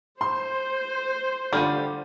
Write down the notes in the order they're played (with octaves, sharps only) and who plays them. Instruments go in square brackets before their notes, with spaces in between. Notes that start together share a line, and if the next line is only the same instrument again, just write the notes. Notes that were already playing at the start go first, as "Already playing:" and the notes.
[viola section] C5 [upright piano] C6
[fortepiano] D3 F4 [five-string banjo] G3 [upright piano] F6 G6 D#7